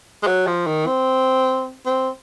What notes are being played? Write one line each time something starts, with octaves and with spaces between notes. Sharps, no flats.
G#3
F#3
F3
D#3
C4
C4